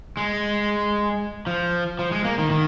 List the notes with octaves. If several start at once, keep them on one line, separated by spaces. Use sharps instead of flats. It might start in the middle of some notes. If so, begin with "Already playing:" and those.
G#3
F3
F3
G#3
A#3
D#3
D#3